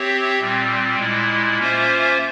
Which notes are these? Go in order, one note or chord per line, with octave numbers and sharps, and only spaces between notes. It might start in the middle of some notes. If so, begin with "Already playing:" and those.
Already playing: C4 G4 C#5 E5
A#2 G3 C4
A#2 G#3 E4
A#3 C#4 F4 C5 E5